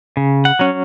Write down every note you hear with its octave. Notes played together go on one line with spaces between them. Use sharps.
C#3
F#5
F#3 C#4